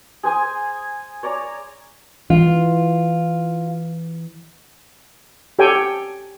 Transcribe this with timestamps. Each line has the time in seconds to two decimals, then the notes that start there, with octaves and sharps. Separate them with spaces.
0.23 G#4 C5 G#5 D#6
1.23 C#5 D5 A#5
2.30 E3 F4
5.59 G4 A4 C#5 G5 G#5